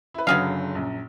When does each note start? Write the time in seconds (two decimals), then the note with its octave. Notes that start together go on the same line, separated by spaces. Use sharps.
0.14 E4 B4
0.27 F#1 D3 F#3 B3 G#4 F5
0.75 A#1 F#2